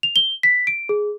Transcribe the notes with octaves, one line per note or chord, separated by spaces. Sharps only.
F7
G7
B6
D7
G#4